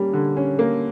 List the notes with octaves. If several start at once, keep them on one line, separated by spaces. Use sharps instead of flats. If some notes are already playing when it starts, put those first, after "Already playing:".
Already playing: G3 A#3 C#4
D3
C#4
A#3